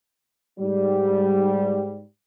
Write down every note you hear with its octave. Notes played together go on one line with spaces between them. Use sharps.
G#2 G3